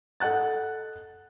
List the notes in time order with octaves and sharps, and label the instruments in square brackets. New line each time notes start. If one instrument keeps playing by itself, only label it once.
[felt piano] A4 D#5 F#5 F#6 A6